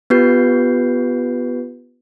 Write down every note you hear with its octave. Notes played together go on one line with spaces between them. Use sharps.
B3 F4 G4 B4 G6 C7